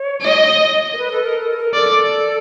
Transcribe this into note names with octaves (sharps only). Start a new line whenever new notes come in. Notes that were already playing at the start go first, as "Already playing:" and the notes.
Already playing: C#5
D#5
A#4
B4
A4
A#4
A4
A4
A#4
A4 D5